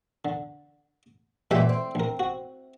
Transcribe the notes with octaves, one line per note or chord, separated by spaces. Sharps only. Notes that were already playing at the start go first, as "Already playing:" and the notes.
D3
F#2 A#2 E3 G#3 G4 E5
C4
A#1 A#4
F#4